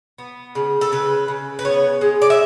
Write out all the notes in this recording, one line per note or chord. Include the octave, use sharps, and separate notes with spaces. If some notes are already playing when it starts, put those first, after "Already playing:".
B3
C#3
A4
C#3 B4
C#3
B4
B3 C#5
G#3
D5
E5